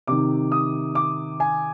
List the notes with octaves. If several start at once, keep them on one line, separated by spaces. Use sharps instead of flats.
C3 D#3 D6
D#6
D6
G#5